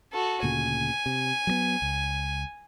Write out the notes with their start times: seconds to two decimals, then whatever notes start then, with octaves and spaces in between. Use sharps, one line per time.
0.13 F#4 A4
0.43 D2 A#2 C#3 G#5
1.06 C3
1.47 F#3 G3 B3
1.82 C#2